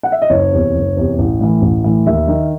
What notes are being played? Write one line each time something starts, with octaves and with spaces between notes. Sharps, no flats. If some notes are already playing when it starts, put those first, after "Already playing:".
F#5
E5
D#5
F#1 C#5
E2 C3
F#1
E2 C3
A1
A2 E3
A1
A2 E3
D#2 E5
D#3